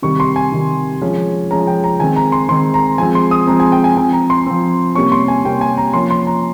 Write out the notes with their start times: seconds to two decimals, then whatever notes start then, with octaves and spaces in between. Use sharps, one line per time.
0.02 C3 D#3 G3 C#6
0.20 C6
0.36 G#5
0.52 C3 D#3 G3
1.01 F3 G#3 C#4
1.51 F3 G#3 C#4 A#5
1.67 G5
1.84 A#5
2.00 D#3 G#3 C4 G#5
2.16 A#5
2.32 C6
2.49 D#3 G#3 C4 C6
2.74 A#5
2.98 F3 G#3 C4 G#5
3.15 C6
3.31 D#6
3.47 F3 G#3 C4 A#5
3.60 G#5
3.72 G5
3.84 G#5
3.97 F3 C4 G#5
4.13 A#5
4.30 C6
4.46 F3 C4
4.95 C3 G3 A#3 C#4 C#6
5.12 C6
5.28 G#5
5.45 C3 G3 A#3 C#4 G5
5.61 G#5
5.77 A#5
5.94 F3 A#3 C#4 C6
6.11 C6
6.27 A#5